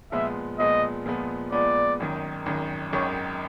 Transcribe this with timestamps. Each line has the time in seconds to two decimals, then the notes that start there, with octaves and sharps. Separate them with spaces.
0.12 A#2 F3 G#3 B3 E5
0.59 A#2 F3 G#3 B3 D#5
1.06 A#2 F3 G#3 B3
1.52 A#2 F3 G#3 B3 D5
2.00 G#1 F#2 D#3
2.46 G#1 F#2 D#3
2.92 G#1 F#2 D#3 C#5